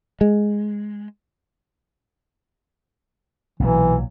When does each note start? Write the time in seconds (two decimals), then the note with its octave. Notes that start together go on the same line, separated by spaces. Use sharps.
0.21 G#3
3.60 B1 A#2 E3 F#3